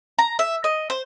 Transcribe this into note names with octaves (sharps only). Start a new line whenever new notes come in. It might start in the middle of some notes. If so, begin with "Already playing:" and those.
A#5
E5
D#5
C5